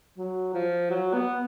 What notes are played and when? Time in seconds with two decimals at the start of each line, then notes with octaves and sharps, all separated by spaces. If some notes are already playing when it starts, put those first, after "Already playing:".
0.18 F#3
0.54 F3
0.90 F#3
1.13 B3